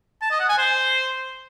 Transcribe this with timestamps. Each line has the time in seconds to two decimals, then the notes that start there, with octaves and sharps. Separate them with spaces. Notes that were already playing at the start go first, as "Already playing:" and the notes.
0.21 A5
0.31 D#5
0.40 F#5
0.49 G#5
0.58 C5